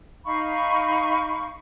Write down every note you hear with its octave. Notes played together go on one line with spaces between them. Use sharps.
D#4 F5 B5 C#6